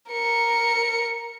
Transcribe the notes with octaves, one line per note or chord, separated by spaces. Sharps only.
A#4 C#7